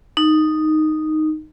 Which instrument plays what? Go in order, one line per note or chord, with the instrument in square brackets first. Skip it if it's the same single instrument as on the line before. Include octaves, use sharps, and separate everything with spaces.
[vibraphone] D#4